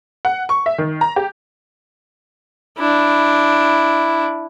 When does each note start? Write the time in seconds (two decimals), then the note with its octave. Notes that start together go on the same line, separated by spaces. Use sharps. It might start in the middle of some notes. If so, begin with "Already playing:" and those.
0.25 F#5
0.49 C#6
0.66 E5
0.78 D#3
1.01 A#5
1.16 G4
2.78 D4 E4